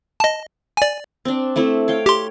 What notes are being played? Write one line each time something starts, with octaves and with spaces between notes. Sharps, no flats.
D#5 A5
D5 G#5
C4 D4
A3 C4 E4
C#5 F5 G5
G4 C6